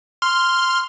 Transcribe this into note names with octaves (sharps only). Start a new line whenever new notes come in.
C6 F6